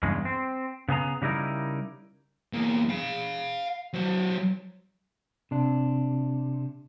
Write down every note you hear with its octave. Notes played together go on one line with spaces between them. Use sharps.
E2 G2 C#3 G#3
C4
C#3 B3 G#4 A#5
C#3 G3 D#4 E4 A#4
E2 A#3
F5 B5
F#3 C5
C3 D4